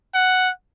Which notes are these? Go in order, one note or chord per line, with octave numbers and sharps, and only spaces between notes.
F#5